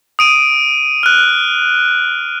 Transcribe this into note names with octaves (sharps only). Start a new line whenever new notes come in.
D#6 D7 D#7
F6 F#6